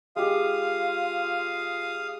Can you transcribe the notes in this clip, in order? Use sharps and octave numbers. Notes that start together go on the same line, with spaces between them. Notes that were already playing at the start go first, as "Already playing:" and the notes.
G#3 F4 G4 F5 D#6